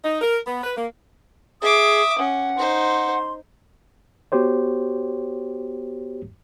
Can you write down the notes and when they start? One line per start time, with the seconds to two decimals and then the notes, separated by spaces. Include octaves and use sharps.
0.04 D#4
0.22 A#4
0.46 B3
0.63 B4
0.76 A#3
1.62 G#4 E5 D6 D#6
2.19 C#4 F#5
2.58 D#4 C5 C6
4.32 B3 F#4 G4 C5 C#5